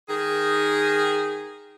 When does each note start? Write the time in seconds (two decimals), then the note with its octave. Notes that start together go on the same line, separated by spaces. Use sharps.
0.09 D#3 G#4